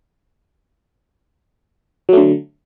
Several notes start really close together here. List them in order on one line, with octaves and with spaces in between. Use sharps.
F#3 A3 D3